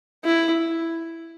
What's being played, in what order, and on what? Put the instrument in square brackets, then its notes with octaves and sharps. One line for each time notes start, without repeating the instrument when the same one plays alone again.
[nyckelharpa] E4